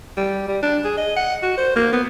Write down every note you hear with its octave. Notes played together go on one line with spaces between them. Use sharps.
G3
G3
D4
G#4
D#5
F#5
F#4
C5
A#3
B3